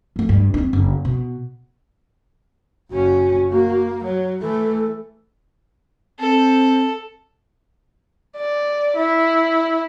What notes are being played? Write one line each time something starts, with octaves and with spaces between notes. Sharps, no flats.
F3 A3
G2
C4 D#4
F#1
B2
F#1 C#4 F#4
A#3
F#3 C#5
E3 A3 A4
C4 A4
D5
E4